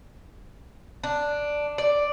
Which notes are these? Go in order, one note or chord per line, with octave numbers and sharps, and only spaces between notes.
D4
D5